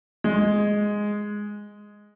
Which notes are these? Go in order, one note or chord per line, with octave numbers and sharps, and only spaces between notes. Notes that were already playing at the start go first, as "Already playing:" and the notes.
G#3